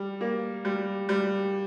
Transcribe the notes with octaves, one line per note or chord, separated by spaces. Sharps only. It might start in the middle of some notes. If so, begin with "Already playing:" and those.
Already playing: G3
A#3
G3
G3